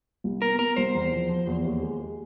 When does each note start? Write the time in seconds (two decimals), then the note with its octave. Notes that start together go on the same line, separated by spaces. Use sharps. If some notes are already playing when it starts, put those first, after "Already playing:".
0.24 C2
0.42 B3 A#4
0.59 B3 A#4
0.77 C2 C5
0.95 E2
1.12 F3
1.29 F3
1.47 E2
1.65 D#2
1.83 G#3
1.99 G#3